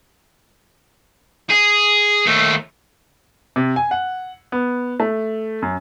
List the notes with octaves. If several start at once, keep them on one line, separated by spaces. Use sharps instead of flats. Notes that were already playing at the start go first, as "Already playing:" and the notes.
G#4
D#2 A3
C3
G#5
F#5
B3
A3
F#2